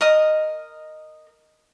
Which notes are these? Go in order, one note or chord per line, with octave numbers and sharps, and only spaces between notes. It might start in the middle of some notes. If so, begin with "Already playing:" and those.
A#4 D#5 D#6